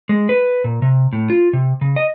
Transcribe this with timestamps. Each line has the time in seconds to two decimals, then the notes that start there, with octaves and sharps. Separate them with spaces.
0.09 G#3
0.29 B4
0.64 A#2
0.82 C3
1.13 A2
1.30 F4
1.53 C3
1.81 C#3
1.96 D#5